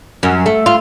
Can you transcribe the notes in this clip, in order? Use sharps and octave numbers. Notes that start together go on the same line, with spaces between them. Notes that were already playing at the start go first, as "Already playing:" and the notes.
F#2
A3
F4